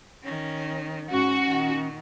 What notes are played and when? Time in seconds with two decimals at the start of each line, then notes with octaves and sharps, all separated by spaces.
0.23 D#3 C#4
1.11 G#2 C#4 F#4
1.47 A#2 D#3